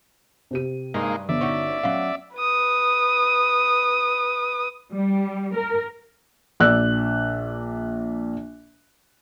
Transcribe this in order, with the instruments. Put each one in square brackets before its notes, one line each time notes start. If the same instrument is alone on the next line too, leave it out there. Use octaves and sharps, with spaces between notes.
[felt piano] C3 G4 D#7
[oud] G2 [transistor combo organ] G#3 A#3 D#4
[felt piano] G1 [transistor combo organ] D5 E5
[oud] C#4 D#4 F#4
[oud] F#3 F5 [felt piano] C#4
[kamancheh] B4 D#6
[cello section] G3
A#4
[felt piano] A#1 D5 E6 F#6